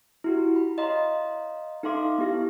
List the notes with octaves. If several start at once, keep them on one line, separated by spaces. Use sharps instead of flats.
E4 F#4 G4
B5
C#5 D#5 F5 A#5 C6
D#4 A4 E5 F5 C6 D6
B3 E4 G4 A#6